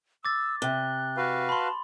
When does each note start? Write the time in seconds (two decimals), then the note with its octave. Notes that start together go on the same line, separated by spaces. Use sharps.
0.25 D6 E6 A6
0.62 C3 F#6 G7
1.17 F#4 B4 F5
1.49 A5 B5 C6